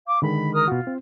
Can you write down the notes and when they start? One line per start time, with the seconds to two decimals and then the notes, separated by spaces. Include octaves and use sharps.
0.06 F5 D6
0.22 D3 D#3 G#3 B5
0.53 A#4 D#6 F6
0.68 B2 F4 F#4
0.87 C4